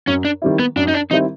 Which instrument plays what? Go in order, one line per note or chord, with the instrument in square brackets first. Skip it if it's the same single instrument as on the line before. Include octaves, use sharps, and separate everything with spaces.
[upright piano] F#2 [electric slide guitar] C#4
[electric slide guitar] D4
[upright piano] D#3 G3 C4 E4
[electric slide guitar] B3
[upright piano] F#2 [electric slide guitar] D4
[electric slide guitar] D#4
D4
[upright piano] D#3 G3 C4 E4 [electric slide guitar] D#4